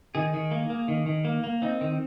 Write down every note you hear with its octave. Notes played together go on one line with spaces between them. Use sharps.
D#3 G#4
D#3
A#3
A#3
D#3
D#3
A#3
A#3
C4 D#4
D#3